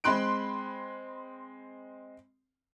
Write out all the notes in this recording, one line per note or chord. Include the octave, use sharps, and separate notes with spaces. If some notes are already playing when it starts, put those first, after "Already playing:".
G#3 C4 B5 C6 F#6 D7